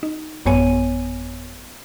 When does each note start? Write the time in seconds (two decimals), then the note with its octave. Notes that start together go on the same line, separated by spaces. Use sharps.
0.03 D#4
0.46 A1 F#2 B3 C#5 G#5 D#7